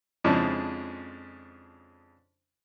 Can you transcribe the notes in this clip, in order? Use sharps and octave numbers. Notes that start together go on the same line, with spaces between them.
F2 C#3 F3 G#3 D4 E4